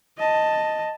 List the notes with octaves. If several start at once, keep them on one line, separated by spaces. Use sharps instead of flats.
D#5 A5